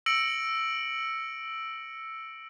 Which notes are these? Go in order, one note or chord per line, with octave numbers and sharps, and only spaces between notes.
E6 A#6 C#7 D7 F#7